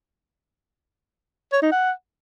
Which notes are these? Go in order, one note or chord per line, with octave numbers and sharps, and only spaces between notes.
C#5
D#4
F#5